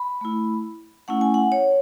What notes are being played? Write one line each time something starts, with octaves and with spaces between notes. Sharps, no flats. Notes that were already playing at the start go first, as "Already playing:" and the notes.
Already playing: B5
A3 E4
A3 C#4 E4 F#5
G#5
F#5
C#5